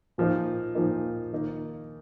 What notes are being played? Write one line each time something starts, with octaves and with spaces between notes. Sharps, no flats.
A#2 F3 A#3 D#4
A#2 F3 A#3 D#4
D#3 A#3 D#4